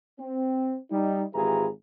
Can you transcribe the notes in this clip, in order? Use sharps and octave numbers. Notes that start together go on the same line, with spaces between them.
C4
G3 D#4
G#1 E3 F4 G4 G#4 A#5